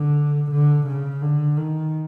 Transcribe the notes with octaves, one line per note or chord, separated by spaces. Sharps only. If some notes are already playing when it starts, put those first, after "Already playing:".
Already playing: D3
D3
C#3
D3
D#3